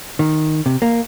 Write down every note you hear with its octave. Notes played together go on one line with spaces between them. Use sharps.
D#3
C3
A#3